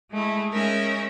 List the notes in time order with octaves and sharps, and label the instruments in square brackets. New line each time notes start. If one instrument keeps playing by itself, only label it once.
[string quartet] G#3 A3 E4
G#3 C#4 D#4 A#4 E5